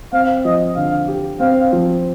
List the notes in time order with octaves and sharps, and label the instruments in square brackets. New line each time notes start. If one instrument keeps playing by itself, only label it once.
[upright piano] C4 [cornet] F5
[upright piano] F3 [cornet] D#5
[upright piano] D3 [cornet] F5
[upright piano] G4
[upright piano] C4 [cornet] F5
[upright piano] F3